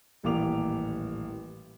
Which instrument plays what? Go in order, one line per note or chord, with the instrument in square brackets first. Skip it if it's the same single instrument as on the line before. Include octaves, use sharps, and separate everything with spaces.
[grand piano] D#1 A1 E3 A#3 D6 F7